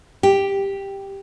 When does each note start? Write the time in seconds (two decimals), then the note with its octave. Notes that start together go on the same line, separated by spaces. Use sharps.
0.23 G4